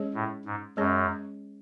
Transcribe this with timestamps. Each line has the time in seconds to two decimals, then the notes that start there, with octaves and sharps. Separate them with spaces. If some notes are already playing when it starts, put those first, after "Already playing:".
Already playing: G#3 C#4 G#4 C#5
0.14 A2
0.45 G#2
0.77 F#2 G#3 C#4 G#4 C#5